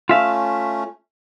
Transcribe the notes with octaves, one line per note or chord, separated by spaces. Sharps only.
A3 C#4 F4 E5 F5